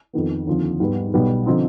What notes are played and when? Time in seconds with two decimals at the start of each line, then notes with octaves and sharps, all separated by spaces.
0.13 F2 D#3 B3
0.47 D#2 D3 F3 C4
0.80 G#2 G3 B3
1.14 B1 B2 G3 B3
1.46 D3 F3 C4 D#4